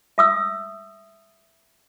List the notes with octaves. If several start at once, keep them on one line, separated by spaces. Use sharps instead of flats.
E5 D#6 E6